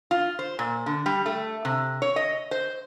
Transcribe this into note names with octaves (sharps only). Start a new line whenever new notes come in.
F4
C5
A#2
D3
G3
A3
C3
C#5
D#5
C5